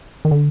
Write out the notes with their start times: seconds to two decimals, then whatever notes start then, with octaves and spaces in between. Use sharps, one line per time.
0.25 D#3
0.31 D3